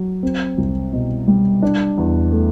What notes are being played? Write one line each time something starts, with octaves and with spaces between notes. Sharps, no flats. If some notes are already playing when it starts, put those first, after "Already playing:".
Already playing: F#3
C4
C2
B2
G3
D4
E2
A3